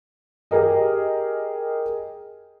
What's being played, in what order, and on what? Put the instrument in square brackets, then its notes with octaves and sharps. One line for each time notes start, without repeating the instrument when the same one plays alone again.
[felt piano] G4 G#4 A#4 D#5